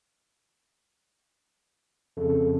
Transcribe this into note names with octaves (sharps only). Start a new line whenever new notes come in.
F2 C#3 A4